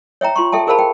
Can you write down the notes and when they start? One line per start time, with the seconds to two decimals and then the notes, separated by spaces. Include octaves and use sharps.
0.21 C#5 E5 G5 A#5
0.36 F4 C6 C#6
0.52 A4 E5 G5 A5
0.67 G#4 A#4 C5 F5 A5 B5
0.79 G5